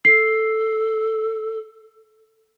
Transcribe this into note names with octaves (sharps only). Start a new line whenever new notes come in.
A4 C7